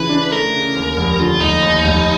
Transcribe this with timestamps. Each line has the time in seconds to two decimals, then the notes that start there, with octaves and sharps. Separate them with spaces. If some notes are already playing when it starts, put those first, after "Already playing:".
Already playing: C#3 E3 B4
0.09 D4
0.31 A3 A#4
0.54 C#3
0.76 D#2
0.97 F1
1.19 D3 F4
1.40 F1 D#4
1.62 D#2
1.84 F1